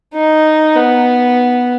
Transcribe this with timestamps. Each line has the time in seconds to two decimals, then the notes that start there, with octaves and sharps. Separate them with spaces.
0.14 D#4
0.76 B3